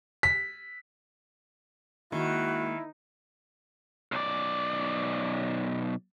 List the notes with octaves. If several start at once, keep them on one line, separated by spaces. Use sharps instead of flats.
B6
D#3 G#3 A#3 E4 F#4 G#5
B1 D5